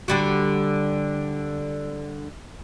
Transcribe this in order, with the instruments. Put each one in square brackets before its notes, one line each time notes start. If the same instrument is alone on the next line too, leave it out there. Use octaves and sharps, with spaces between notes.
[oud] D3 G3 F#4